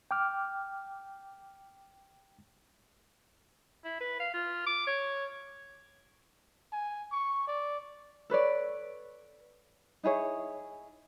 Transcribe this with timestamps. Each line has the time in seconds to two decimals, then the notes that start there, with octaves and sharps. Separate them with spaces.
0.11 G5 D6 F6
3.84 E4
4.00 B4
4.20 F5
4.34 F4
4.66 D6
4.87 C#5
6.72 G#5
7.12 C#6
7.47 D5
8.30 A4 B4 C#5 D5
10.03 D#4 E4 G#4 C#5